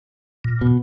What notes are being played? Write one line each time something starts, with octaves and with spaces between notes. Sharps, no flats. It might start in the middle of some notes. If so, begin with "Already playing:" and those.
A#2
B2